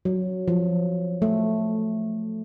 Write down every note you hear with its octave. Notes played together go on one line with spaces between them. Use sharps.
F#3
F3
A3